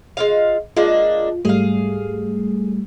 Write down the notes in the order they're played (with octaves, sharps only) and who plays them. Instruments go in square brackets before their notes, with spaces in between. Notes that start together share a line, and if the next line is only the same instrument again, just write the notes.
[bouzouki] G#3 F4 F5
[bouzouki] G#3 A#3 D4 [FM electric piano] F4
[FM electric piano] G#2 G3 A3 [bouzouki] G#4 F5